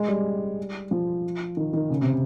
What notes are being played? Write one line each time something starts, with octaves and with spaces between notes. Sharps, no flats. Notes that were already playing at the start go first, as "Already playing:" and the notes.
Already playing: G#3
G3
F3
D#3
D#3
C#3
C3